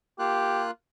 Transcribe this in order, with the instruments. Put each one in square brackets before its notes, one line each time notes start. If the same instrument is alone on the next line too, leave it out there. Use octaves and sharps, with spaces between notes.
[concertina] A#3 F4 F#6 [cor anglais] G4